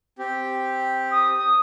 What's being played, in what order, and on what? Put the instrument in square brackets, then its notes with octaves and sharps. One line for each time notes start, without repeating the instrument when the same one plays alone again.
[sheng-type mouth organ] C4 G4
[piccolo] D#6